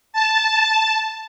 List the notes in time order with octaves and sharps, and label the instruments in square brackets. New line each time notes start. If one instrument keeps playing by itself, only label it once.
[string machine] A5